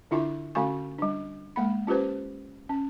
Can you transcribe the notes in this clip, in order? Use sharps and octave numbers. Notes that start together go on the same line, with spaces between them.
D3 D4 E4 F4 E5 C#6
D3 A3 C#4 F#4 G#5 C#6
G3 D4
G#3 A#3 B5
C#4 F4 G4 B4 C5
C#4